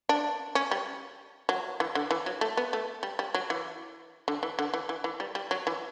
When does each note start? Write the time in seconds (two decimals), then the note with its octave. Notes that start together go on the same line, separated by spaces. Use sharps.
0.09 D4
0.55 C#4
0.71 G3
1.49 F#3
1.80 E3
1.95 D3
2.11 E3
2.26 F#3
2.41 A3
2.57 B3
2.73 A3
3.03 G3
3.19 G3
3.34 F#3
3.50 E3
4.28 D3
4.43 E3
4.59 D3
4.74 E3
4.89 E3
5.04 E3
5.20 G3
5.35 G3
5.51 F#3
5.67 E3